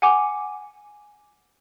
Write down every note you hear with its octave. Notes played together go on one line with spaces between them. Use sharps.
F#5 G#5 D6